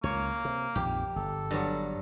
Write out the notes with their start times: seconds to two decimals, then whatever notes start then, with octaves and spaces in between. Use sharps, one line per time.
0.04 C#2 A#3 C#5
0.45 C3
0.76 A#1 F2 D#3 G4
1.16 G1 A4
1.51 G2 F#3